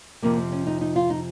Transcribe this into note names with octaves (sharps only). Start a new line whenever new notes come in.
F2 C3 F3 A#3
C4
C#4
D#4
D#4
F4
D#4